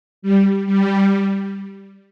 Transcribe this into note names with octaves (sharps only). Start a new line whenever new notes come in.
G3
G3